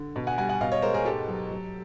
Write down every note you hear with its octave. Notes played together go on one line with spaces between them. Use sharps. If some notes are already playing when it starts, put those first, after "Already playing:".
Already playing: D3
B2
F#5 G#5
G3 F#5 G#5
F#5 G#5
B2 D#5 F5
C#5 D#5
G#3 A#4 C5
G#4 A#4
G#2 G4 A4
F#3
F#3